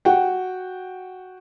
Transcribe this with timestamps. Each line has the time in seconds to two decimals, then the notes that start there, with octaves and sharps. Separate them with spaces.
0.05 F#4 F#5 G5